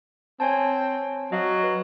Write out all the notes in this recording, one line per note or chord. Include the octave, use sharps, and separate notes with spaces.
C4 C#5 G#5 A5
F#3 D#5 F5
B4